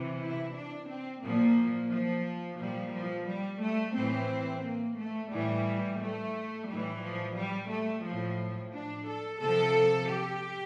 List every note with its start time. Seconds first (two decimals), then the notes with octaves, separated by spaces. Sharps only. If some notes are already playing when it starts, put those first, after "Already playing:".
Already playing: C3 E3
0.22 E4
0.55 D4
0.89 C4
1.23 A#2 F3 A#3
1.91 F3
2.59 A#2 F3 G3
2.94 F3
3.28 G3
3.62 A3
3.96 A2 E3 C4
4.65 A#3
4.99 A3
5.32 A2 E3 G3
6.01 A3
6.68 A2 E3 G3
7.02 F3
7.37 G3
7.71 A3
8.05 A2 F3
8.74 D4
9.08 A4
9.41 C3 F3 A4
10.10 G4